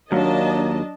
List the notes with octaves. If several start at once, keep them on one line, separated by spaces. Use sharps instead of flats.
D#2 F#3 A#3 D4 D#5 A5